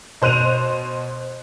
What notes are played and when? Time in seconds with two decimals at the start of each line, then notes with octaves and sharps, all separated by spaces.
0.22 B2 C5 F#6 D#7 F7